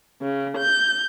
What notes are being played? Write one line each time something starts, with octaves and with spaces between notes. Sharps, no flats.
C#3
G6